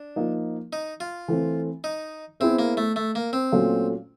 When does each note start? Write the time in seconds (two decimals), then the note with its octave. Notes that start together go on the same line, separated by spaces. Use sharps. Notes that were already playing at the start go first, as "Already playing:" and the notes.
Already playing: D4
0.16 F3 A#3 D#4
0.73 D#4
1.00 F4
1.28 E3 A3 C4
1.84 D#4
2.40 B3 C4 E4 G#4 C5 E5
2.59 A#3
2.77 A3
2.96 A3
3.15 A#3
3.33 C4
3.52 A#2 F#3 A3 C#4 F4